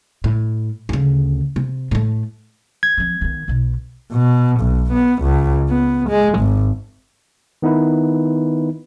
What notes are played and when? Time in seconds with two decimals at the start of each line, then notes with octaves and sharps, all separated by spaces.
0.24 A2
0.89 D2 C#3
1.56 C3
1.91 A2 A3
2.83 G#6
2.98 F3 C4
3.21 D#3 B3
3.48 B1 B2
4.12 B2
4.60 B1
4.92 B3
5.22 C#2
5.69 B3
6.09 G#3
6.39 G#1
7.62 D#3 B3 D#4 E4 B4